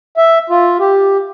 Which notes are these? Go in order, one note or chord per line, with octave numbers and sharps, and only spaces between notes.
E5
F4
G4